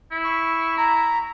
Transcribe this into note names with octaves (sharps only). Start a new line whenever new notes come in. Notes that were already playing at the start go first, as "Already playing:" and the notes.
E4
C#6
A#5